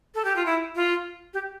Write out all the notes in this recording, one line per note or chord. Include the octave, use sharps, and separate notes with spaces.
A4
G4
F4
E4
F4
G4